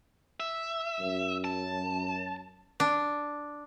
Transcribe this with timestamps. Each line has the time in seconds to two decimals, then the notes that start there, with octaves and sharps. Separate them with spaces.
0.40 E5
0.99 F#2
1.44 A5
2.80 D4